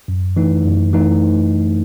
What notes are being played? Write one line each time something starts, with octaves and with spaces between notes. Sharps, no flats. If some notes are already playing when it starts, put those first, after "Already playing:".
F#2
E3 A3 D#4
F#2
E3 A3 D#4